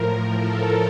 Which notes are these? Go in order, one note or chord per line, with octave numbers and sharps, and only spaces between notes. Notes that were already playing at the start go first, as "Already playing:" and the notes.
Already playing: A2 F3 A#4
A4